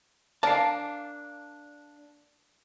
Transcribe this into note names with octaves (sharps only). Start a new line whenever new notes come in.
A#3 D4 F5 G#5 A5